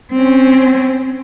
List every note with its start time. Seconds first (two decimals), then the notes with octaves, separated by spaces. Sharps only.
0.13 C4 C#4